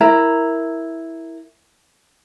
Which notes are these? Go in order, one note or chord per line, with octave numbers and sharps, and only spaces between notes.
E4 A#4 A#5